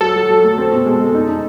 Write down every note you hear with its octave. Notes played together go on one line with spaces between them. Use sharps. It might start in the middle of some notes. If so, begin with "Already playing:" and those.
F#3 A4
F#3
F#3
A3
C4
B2
G#3
G#3
D#4
D#4